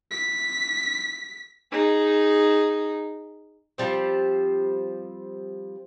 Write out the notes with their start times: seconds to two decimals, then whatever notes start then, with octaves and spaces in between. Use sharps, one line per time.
0.11 B6
1.72 D#4 G#4
3.78 F3 G3 C4